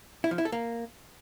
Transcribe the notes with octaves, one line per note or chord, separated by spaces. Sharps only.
E4
F3
E4
A4
A#3